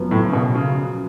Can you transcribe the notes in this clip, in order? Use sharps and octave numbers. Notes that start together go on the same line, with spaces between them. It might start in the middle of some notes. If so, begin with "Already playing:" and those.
Already playing: F#2 F3 B3
A2
C#3
B2
C#3